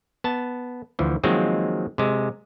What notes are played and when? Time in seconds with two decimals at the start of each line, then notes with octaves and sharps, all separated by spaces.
0.24 B3 A5
0.99 D2 E3 F3
1.24 D#3 F3 F#3 G#3 A#3 C4
1.98 C3 G#3